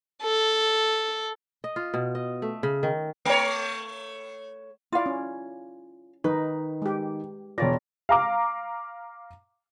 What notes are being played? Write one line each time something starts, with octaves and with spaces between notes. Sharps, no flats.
A4
D#5
F4
B2
D#5
A3
C#3
D#3
A3 C#5
E4 F4 D5 F5
C#4
D#3 D#4 B4
G#3 G4
E1 F4 C#5 D5 A#6
F5 A#5 D6